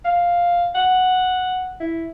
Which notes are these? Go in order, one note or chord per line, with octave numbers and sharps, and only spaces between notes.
F5
F#5
E4